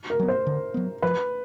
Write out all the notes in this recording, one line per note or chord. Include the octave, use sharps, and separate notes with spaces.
A#4
F#3 B3
C5
D3
F#3 B3
F3 B4